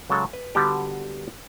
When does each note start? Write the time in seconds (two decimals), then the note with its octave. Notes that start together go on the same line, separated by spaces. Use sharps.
0.10 C#3 F#3 G#3 A4
0.33 B4
0.55 D3 G3 B3 F#4 G4 A4